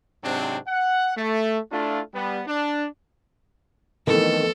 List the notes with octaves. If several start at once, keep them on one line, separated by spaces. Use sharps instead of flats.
G#2 C3 F#3 C4 D4
F#5
A3
A3 D4 E4 F4
G3 B3
D4
F2 B2 D#3 E3 A3 A4